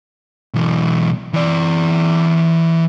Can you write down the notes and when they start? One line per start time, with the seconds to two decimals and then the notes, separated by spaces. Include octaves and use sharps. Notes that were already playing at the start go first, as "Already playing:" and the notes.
0.54 B1 E3
1.33 E3 D5